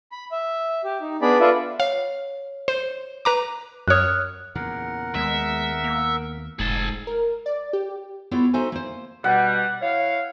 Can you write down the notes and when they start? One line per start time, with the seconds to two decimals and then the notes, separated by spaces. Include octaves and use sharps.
0.12 B5
0.32 E5
0.84 G4
1.01 D#4
1.22 B3 D4 G#4 D5 B5
1.40 F4 A4 B4 D5 E5
1.80 C#5 F5
2.68 C5
3.25 B4 A#5 D6
3.88 F#2 C#5 D#6 F6 F#6
4.55 E2 A#2 C#3 A#4 F#5
5.15 D#2 G#3 B3 E5
5.84 A#3
6.59 F1 G#2 G#4 G#5 A5
7.07 A#4
7.46 D5
7.73 G4
8.31 B3 E4 F4 G4 A4 C#5
8.53 D#4 F#4 A4 C5 E5 G#5
8.72 A#3 C5
9.24 B2 G3 F#5
9.81 E4 C#5 F5